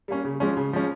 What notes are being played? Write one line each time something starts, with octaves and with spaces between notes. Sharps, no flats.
G3 A#3 C#4
C#3
F3 G#3 C#4
C#3
F3 G#3 C#4